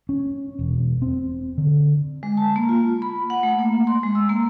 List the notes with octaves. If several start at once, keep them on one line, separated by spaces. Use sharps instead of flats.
C#4
E1
C4
D3
G#3
A5
A#3
F4
B5
F#5
A3
A#3
C6
G#3
E6
A#3